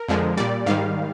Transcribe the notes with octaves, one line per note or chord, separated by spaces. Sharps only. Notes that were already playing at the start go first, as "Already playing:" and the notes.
Already playing: A#4
F2 D3 F3 G#3
A#2 G3 D5
G#2 D#3 G3 F5